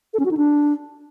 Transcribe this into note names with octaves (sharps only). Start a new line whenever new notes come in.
A4
C#4
F#4
D#4
D4